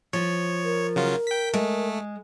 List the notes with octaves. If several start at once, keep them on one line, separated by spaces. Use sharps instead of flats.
F3 C#5
A#4
C#3 F#3 F4
G5 B6
G#3 A3